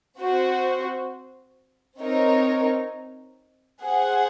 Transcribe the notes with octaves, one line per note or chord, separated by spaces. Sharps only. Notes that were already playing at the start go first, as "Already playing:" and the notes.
C4 F#4 C5
C4 D#4 A#4 C#5
G#4 C5 F#5